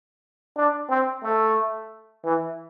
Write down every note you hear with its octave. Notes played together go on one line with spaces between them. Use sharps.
D4
C4
A3
E3